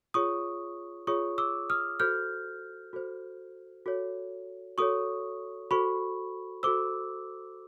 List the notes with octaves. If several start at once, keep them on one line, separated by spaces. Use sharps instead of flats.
F4 G#4 C#5 C#6 D#6
F4 G#4 C#5 C#6 D#6
D6 E6
D#6 F6
F#4 A4 C5 F6 G6
F#4 A4 C5
F#4 A4 C#5
F#4 A4 C#5 C#6 D#6
F#4 A4 C5 B5 C#6
F#4 A4 C5 D6 E6